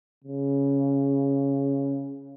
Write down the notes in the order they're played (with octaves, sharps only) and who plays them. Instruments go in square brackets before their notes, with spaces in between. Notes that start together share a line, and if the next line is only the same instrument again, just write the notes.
[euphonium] C#3